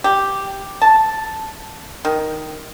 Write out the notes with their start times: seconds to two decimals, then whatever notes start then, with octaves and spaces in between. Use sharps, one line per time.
0.04 G4
0.82 A5
2.05 D#3